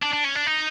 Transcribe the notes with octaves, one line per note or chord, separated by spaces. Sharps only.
D4
D4
C#4
D4
D#4